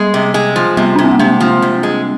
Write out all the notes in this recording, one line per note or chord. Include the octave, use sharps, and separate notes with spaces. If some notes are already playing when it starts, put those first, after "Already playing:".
Already playing: G3 G#3
C3
G#3
F3
C3 G3
C3 D4
C4
A#3
C3 G#3
F3
C3
G#3